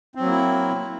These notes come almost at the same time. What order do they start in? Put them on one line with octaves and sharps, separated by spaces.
C4 F#3 A#3 E4